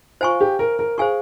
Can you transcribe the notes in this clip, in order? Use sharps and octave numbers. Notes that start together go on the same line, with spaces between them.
F4 C5 F5 G#5 C#6
G4
A#4
A#4
G#4 C5 F5 G#5 C#6